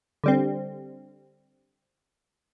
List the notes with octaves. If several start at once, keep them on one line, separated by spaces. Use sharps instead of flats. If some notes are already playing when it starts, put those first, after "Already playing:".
D3 G3 C4